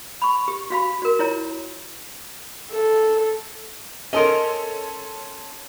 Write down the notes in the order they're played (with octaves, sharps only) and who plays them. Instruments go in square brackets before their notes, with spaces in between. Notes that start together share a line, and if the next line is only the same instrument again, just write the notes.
[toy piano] B5 C#6
G4
F#4 F5 B5
F#4 A#4
E4 F4 C#5 A#5
[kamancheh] A4
[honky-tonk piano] C#4 A4 C6 [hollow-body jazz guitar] A#4 D#5